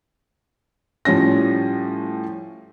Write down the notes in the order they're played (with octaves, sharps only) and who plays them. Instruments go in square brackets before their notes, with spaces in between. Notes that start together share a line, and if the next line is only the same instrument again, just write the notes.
[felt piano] A2 F3 G3 C#4 A#6